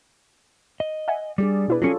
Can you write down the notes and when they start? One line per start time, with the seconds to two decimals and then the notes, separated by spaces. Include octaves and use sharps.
0.80 D#5
1.08 E5 F#5 G#5
1.38 G3 D4 G#4 D5
1.68 B2 E4 B4
1.82 F#3 G3 C#4 F4 G#4 A4 C#5